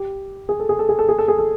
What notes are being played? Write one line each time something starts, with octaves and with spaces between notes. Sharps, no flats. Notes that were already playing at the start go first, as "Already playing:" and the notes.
Already playing: G4
G#4
A4
G#4
A4
G#4
A4
G#4
A4
G#4
A4